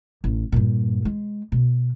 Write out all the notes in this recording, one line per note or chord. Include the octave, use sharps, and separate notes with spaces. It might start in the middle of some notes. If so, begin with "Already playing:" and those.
A1
G2 A#2
G#3
B2